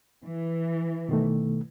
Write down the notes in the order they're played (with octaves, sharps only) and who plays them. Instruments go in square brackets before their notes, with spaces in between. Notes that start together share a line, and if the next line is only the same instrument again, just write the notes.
[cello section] E3
[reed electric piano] B2 D#3 A3